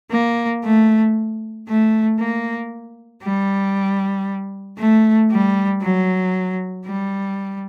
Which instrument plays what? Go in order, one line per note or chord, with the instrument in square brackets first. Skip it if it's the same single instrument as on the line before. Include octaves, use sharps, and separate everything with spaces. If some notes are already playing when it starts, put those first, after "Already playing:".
[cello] A#3
A3
A3
A#3
G3
A3
G3
F#3
G3